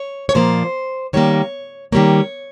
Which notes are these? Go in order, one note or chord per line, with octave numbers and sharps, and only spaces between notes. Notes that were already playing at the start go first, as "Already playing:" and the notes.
Already playing: C#5
C#5
A#2 F3 A#3 C5
D#3 G3 A#3 C#5
D#3 G3 A#3 C#5